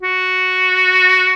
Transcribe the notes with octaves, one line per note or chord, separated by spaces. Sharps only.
F#4